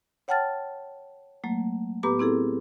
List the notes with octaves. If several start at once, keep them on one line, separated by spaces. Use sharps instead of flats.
C#5 F#5 G5 A5 F6 A6
F#3 A3 A#3
A2 B3 G4 B4 A#5 D6
C4 E4 G#4 A4